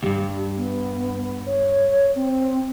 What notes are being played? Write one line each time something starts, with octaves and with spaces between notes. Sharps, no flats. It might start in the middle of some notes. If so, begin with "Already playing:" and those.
D2 G2 G4
B3
C#5
C4